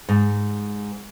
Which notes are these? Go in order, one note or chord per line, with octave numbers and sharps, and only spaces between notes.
G#2